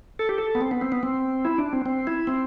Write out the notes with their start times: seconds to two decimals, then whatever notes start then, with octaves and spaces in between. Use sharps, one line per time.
0.19 A4
0.29 G4
0.38 A4
0.55 B3
0.61 C4
0.71 B3
0.81 C4
0.92 B3
1.03 C4
1.45 E4
1.58 D4
1.73 C4
1.86 C4
2.07 E4
2.27 C4